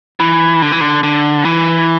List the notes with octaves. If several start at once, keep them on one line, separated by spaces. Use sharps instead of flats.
E3
D3
E3
D3
D3
E3